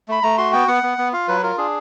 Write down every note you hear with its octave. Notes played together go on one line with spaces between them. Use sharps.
A3 B5
A3 A#5
F#4 C6
B3 G5
B3 F#5
B3
B3
F4 F5
F#3 B4
F4 A#4
D4 G#4